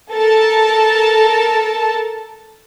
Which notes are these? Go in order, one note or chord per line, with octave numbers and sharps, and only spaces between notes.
A4 A#4 A5